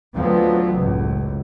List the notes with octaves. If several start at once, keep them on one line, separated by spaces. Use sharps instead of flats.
D2 F3 F#3 B3 C4
F#1 C#2 A2